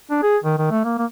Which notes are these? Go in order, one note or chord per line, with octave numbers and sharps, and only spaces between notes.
D4
G#4
D#3
D#3
A3
A#3
A#3